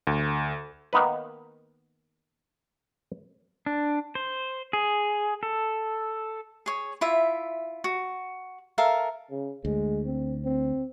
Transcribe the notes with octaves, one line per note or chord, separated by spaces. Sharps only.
D2
D#3 A#3 B3 D#4 B4
D4
C5
G#4
A4
G#4 C#5
E4 F4 E5
F#4
A4 A#4 E5 F5
C#3
D2 G#3
C4
C4